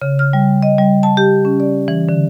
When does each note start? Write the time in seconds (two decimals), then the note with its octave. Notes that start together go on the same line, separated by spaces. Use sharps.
0.02 C#3
0.19 F6
0.33 G3
0.63 D#5
0.78 G3
1.03 A5
1.17 G4
1.45 C#4
1.60 D5
1.88 E3
2.09 D3